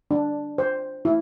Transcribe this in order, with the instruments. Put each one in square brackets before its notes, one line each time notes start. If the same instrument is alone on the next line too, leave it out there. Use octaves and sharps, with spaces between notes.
[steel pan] D4
C5
E4